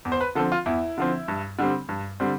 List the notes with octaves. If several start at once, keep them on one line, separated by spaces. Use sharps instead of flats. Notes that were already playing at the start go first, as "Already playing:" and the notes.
E2
C5
B4
D3 F3 C4 A4
F4
E2 E4
D3 F3 C4
G2
D3 G3 C4
G2
D3 G3 C4